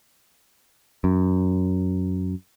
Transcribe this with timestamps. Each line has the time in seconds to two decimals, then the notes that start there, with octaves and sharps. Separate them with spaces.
1.04 F#2